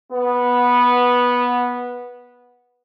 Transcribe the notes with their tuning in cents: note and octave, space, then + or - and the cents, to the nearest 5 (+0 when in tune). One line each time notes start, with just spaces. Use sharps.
B3 -10